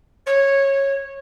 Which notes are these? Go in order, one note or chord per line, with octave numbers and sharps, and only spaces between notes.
C#5